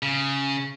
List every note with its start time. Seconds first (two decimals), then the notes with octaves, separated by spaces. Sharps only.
0.03 C#3